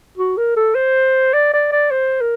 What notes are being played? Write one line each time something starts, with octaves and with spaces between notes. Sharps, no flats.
F#4
A#4
A4
C5
D5
D5
D5
C5
A#4